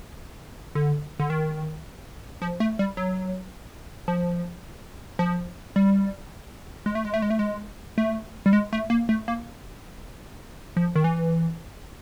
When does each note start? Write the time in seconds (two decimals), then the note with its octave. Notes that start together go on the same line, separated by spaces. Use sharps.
0.75 D3
1.19 D3
1.30 D#3
2.42 F3
2.60 A3
2.79 G3
2.97 F#3
4.08 F3
5.19 F3
5.76 G3
6.86 G#3
6.95 A3
7.05 G#3
7.14 A3
7.22 G#3
7.30 A3
7.39 G#3
7.98 A3
8.46 G3
8.53 G#3
8.73 A3
8.90 A#3
9.09 A3
9.28 A#3
10.77 F3
10.96 D#3
11.04 E3